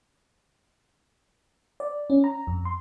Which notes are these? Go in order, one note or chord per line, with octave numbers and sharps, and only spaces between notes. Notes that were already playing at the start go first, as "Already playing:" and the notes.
D5
C#4
A#5
F2
C6